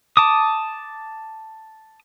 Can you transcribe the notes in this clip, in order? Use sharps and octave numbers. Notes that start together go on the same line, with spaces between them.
A5 D6 D#6